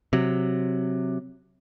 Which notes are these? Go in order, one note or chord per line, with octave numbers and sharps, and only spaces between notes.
C3 F#3